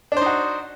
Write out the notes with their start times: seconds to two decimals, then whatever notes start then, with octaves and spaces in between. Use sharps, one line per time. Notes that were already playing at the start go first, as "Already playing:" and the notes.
0.12 D4
0.17 C5
0.21 D#4
0.26 F#4